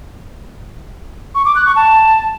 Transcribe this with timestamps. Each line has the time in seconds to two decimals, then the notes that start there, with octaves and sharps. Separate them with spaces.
1.35 C#6
1.45 D6
1.55 F#6
1.66 C#6
1.76 A5